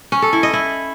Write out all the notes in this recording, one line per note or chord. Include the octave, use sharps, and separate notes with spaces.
C#4
A4
E4
D#5
E4